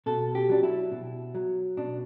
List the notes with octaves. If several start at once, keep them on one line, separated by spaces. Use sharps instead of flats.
B2 A4
G4
F#3 D4
E4
B2
F#3
B2 D4